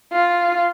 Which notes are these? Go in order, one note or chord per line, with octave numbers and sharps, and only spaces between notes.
F4